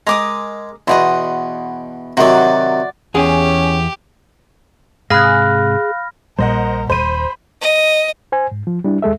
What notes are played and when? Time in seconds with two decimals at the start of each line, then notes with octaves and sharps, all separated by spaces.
0.07 G#3 A#4 D6 D#6
0.88 E2 B2 D#5 F#5 C6
2.17 C3 D#3 F#3 F#4 D5
3.14 E2 C#4 G4 G#4
5.10 G#2 C3 G#4 F5 B5 F6 F#6 A#6
6.39 A#1 A#2 G3 A#4 C5 D#5 F#5
6.90 D#1 C5 B5 D#7
7.62 D#5
8.32 C5 G#5
8.52 G#2
8.67 F3
8.84 G3 D4 E4
9.02 D#2 G#3 A4 E5